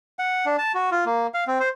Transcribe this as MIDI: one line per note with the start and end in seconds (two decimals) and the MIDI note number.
0.19 0.45 78
0.46 0.56 62
0.58 0.72 81
0.75 0.90 66
0.92 1.04 65
1.06 1.27 58
1.34 1.44 77
1.47 1.59 60
1.60 1.69 72